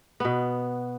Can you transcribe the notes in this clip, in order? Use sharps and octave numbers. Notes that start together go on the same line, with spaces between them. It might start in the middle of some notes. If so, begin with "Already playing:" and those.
B2 B3